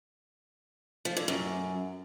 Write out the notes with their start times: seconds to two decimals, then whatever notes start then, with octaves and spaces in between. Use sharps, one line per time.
1.05 F3
1.17 D3
1.28 F#2